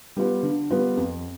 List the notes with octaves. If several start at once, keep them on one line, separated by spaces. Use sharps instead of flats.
G3 B3 F4 B4
D3
G3 B3 F4 B4
F2